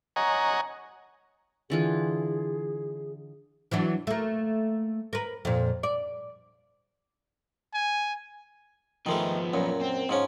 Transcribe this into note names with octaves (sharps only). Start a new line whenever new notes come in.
C#5 D#5 F#5 G#5 A#5
D3 E3 F4 G#4
E3 F#3 D4
A3 A#3
A#4 B4
F2 A#2
D5
G#5
D#3 F3 G#3 A3 B3
F#2 A#2
C4
G#2 F3 C#4